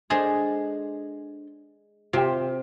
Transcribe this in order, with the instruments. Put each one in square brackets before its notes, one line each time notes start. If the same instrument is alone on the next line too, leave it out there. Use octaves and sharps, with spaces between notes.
[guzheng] G#3 G#4 A5 [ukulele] D4 A4 C5
[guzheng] C3 C4 [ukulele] F4 G4 G5